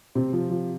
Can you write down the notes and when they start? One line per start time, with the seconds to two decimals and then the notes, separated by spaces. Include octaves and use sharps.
0.15 C3 C4
0.33 F3
0.51 F3